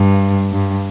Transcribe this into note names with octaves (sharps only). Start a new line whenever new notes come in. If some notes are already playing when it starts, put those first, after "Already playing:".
Already playing: G2
G2